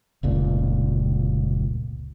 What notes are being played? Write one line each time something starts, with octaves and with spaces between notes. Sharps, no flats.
F1 C#2 A#2